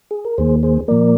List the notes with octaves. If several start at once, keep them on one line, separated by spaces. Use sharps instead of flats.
G#4
A#4
D#2 D#3 A#3 G#4 C5
G#4 C5
A#2 F3 A#3 A#4 D5